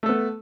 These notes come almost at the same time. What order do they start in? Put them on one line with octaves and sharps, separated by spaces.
A3 A4 B3